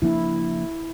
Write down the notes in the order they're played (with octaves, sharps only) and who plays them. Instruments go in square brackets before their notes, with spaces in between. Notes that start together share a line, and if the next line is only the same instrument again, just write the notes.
[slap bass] C#3 F3 A#3 D4 [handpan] E4